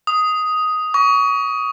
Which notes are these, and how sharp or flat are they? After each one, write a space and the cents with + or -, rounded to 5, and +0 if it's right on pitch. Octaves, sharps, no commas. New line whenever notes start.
D#6 +5
C#6 +30